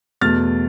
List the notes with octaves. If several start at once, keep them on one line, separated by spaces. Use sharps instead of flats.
E2 B2 A3 F6 A6